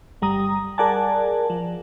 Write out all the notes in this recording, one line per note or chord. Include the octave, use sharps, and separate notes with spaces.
G1 G3 A#5 D#6
G#4 A#4 D5 F#5 G#5 A5
F3